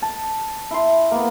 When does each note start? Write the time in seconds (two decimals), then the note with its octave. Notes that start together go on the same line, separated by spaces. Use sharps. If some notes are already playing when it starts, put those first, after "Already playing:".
0.02 A5
0.71 E4 C6
1.12 A#3 B3